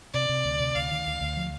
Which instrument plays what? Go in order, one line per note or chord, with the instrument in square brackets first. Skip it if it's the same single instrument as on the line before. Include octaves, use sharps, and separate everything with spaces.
[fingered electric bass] C3 [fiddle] D5
[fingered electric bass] C3
D2
C3
[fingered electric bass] D2 [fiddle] F5
[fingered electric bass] D#3
D2
D2
F3